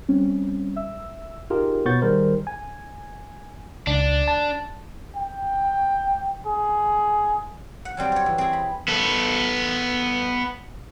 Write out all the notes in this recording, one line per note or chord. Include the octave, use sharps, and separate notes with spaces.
G3 C4 C#4
E5 E6
D#4 F4 G4 G#4 A#4
B2 B3 C#5 C#6 G6 A6
D#3 G3 G#4 A#4 C5
G#5
C#2 D4
A5
G5
G#4
F#5
F#3 G3 C4 D5
C5 C#5
E3
C4 G#4
B5
B3 A4